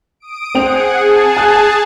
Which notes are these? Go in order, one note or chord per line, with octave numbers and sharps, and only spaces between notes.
D#6 D7
C4 G#4 F#5 G5 F7
G#4 A5
G#5 F#6